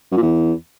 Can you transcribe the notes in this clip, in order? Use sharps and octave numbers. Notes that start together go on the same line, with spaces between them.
F#2
A#2
E2